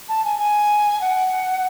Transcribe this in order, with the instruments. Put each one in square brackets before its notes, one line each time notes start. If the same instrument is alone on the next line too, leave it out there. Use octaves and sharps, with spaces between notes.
[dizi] A5
G#5
G#5
F#5